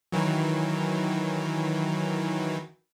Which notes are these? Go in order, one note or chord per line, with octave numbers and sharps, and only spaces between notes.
D#3 E3 F#3